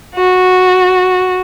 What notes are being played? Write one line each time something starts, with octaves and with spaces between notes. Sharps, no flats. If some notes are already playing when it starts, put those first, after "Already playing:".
F#4